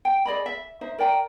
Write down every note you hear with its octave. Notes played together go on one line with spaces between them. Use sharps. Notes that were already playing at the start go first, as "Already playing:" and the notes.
G5
G#4 D5 D#5 B5
E5
D#4 C5 E5
A#4 D5 G5 A#5